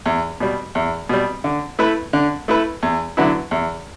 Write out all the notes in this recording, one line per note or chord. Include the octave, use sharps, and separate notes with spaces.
E2
B2 G3
E2
B2 G3
D3
A3 E4 B4
D3
A3 E4 B4
E2
D3 F#3 B3 E4
E2